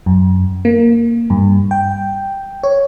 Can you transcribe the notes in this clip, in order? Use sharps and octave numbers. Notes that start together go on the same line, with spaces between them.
F#2
A#3
G2
G5
C#5